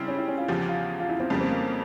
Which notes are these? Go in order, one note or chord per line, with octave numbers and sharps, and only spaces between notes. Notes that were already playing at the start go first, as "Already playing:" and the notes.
Already playing: C#3 G3 C4 E4
C#4
E4
C#4
F4
E2 C#3 F3 G4
F4
F4
E4
C4
F2 C#3 G3 A#3
C4
A#3